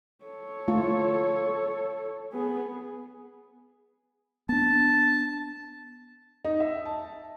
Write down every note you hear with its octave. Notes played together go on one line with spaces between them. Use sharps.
A4 C#5
A3 F4
B3 G#4
B3 D4 A5
D#4
E5
A5